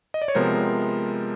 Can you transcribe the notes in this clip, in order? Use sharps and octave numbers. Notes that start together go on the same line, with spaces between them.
D#5
D5
C#5
C3 F3 G#3 B3 A#4 C5